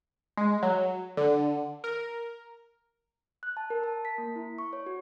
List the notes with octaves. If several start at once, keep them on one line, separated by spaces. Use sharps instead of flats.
G#3
F#3
D3
A#4
F#6
A5
A#4
A5
B6
A#3
E4
C#6
C#5
F#4